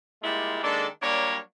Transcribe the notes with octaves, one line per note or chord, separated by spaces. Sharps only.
G3 G#3 A#3 E4 F4
D#3 G#3 A#3 D4 A4
F#3 G3 A#3 D4 A#4 C#5